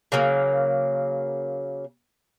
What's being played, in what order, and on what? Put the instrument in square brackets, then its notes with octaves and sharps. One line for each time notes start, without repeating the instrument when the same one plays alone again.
[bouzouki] C#3 F#3 A#3